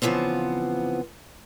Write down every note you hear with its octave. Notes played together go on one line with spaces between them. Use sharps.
C#3 E3 F3 B3 C4